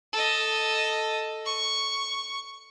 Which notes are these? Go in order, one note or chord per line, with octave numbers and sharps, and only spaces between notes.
A4 D#5
C#6